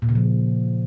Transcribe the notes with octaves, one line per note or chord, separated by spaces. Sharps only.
A#2
C#3
F3